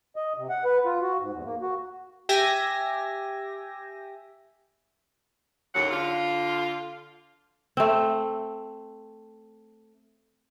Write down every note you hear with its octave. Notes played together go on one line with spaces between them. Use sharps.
D#5
C3
F#5
B4
F4
F#4
G#2
E2
A#3
F#4
G4 E5 G#5 A#6
D#2 A2 C#3 F#3 F#5
D3 F4
A3 C4